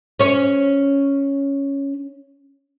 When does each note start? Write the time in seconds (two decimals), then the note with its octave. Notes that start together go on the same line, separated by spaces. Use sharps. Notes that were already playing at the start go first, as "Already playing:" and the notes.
0.19 C#4 C#5